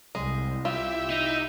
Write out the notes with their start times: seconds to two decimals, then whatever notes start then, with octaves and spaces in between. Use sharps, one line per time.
0.15 C2 G#3
0.65 E4 F4 G4 E5
1.10 D#4